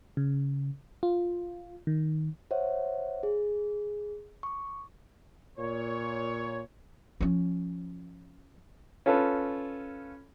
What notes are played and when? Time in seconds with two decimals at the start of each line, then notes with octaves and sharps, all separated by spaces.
0.17 C#3
1.03 F4
1.87 D#3
2.51 C5 C#5 E5 F#5
3.23 G#4
4.43 C#6 D6
5.58 A#2 C#5
7.21 F3 C#4
9.06 C#4 F4 A4 B4